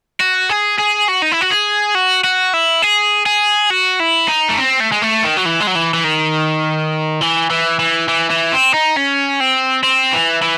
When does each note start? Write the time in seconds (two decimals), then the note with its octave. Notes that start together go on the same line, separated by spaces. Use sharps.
0.20 F#4
0.49 G#4
0.78 G#4
1.08 F#4
1.22 D#4
1.31 E4
1.41 F#4
1.51 G#4
1.95 F#4
2.24 F#4
2.54 E4
2.82 G#4
3.26 G#4
3.71 F#4
4.00 E4
4.28 D#4
4.49 A3
4.58 C4
4.80 A3
4.92 G#3
5.02 A3
5.24 D#3
5.37 F#3
5.45 E3
5.60 G#3
5.67 F#3
5.75 E3
5.94 E3
6.04 D#3
7.21 E3
7.50 E3
7.79 E3
8.08 E3
8.30 E3
8.52 C4
8.73 D#4
8.96 C#4
9.40 C4
9.84 C4
10.13 E3
10.42 E3